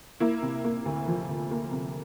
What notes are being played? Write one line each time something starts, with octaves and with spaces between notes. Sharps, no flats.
A#3 E4
C3
A#3
D2
F3
D2
A#3
C3